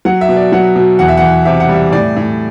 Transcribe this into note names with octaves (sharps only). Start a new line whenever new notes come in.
F#3 F#5
E5
B2
D5
F#3 F#5
B2
E2 F#5
E5
E2 F#5
C3 E5
F#5
G3
E5
A2 D5
A2